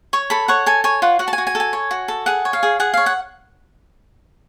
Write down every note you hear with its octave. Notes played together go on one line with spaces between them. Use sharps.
C#5 C#6
A4 B5
C#5 F#5
A4 G#5
C#5 G#5
F4 F#5
F#4 F#5
A5
G#5
F#4
G#5
A4
G#5
C#5
F#4
A4
G#4 F#5
C#5
F5
G#4
G#4 F#5
C#5 F5
F#5